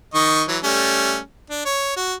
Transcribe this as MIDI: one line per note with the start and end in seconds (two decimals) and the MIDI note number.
0.14 0.43 51
0.14 0.43 75
0.14 0.43 85
0.48 0.58 52
0.48 0.58 54
0.64 1.19 55
0.64 1.19 57
0.64 1.19 61
1.50 1.62 62
1.65 1.95 73
1.97 2.14 66